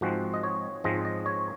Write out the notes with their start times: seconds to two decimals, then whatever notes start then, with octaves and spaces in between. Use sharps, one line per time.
0.01 G#2 F3 G#3 C4 F#4
0.34 D#5
0.43 C#5
0.84 G#2 F3 G#3 C4 D#5
1.05 D#5
1.26 C#5